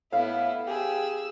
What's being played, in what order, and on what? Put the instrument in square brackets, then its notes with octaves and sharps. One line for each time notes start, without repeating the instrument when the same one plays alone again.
[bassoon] A2 [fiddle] B3 E4 [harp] F5
[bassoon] G4 [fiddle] G#4 E6